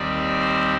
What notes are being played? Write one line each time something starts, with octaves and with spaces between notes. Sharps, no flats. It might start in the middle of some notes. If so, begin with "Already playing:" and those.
Already playing: D#2 D#3 G3 C4 D5
C5